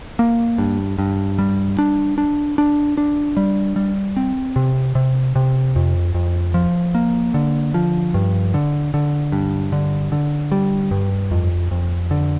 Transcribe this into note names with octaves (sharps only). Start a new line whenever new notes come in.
A#3
G2
G2
G3
D4
D4
D4
D4
G3
G3
C4
C3
C3
C3
F2
F2
F3
A#3
D3
F3
G2
D3
D3
G2
D3
D3
G3
G2
F2
F2
D3